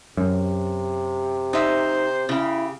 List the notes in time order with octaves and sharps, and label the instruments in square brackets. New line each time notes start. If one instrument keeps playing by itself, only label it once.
[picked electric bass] F#2 [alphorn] C3
[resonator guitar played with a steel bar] D#4 E5 [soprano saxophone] C5
[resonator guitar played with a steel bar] C#3 G4 [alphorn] E4